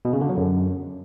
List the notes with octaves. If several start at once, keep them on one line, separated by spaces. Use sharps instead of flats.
B2
C#3
D3
F#3
F#2